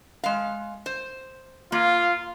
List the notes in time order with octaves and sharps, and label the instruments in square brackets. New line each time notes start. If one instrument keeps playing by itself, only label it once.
[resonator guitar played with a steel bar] G#3 F5
C5
[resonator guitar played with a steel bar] A#3 [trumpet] F4